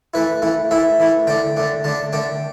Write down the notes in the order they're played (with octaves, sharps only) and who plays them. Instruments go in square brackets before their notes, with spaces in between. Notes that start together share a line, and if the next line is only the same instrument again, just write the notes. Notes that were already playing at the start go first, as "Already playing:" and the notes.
[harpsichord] E3 A3 E4 B4
E3 A3 E4
E3 A3 E4 E5
E3 A3 E4
D3 A3 D4 G5
D3 A3 D4
D3 A3 D4 A5
D3 A3 D4 G5